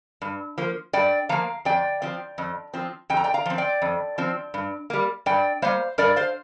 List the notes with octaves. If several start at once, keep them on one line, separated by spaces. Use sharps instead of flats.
G2
F3 A#3
G2 D5 G5
F3 A#3 F5 A#5
F2 D5 G5
F3 C4
F2
F3 C4
F2 G5
A#5
D5 G5
F5 A#5
F3 C4
D5 G5
F2
F3 C4
G2
G3 A#3
G2 D5 G5
G3 A#3 C5 F5
G2 A#4 D5
C5 F5